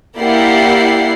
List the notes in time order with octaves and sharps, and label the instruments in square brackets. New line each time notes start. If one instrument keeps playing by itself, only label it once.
[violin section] A#3 E4 G4 D5 F#5 C7